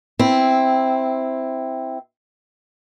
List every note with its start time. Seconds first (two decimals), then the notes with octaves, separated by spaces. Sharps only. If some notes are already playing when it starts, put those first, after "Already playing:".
0.19 C4 E4